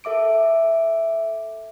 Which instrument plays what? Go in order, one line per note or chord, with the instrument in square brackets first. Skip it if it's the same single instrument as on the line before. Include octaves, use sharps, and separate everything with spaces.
[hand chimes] A4 E5 D6 D7